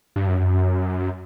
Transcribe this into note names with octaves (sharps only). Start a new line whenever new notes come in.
G2
F#2